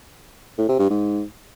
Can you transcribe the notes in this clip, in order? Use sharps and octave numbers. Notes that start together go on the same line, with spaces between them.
A2
C3
G2
G#2